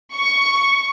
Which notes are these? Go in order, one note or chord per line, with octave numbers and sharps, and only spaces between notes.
C#6